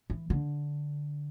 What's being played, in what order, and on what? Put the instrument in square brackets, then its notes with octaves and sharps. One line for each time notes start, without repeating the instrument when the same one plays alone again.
[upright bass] E3
D3